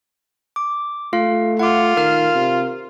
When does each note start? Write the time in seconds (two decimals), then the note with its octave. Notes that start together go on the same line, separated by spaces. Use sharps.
0.56 D6
1.13 A3 F4 F5
1.59 F4 F#5 D6
1.97 D#3 A#4 F6
2.35 C3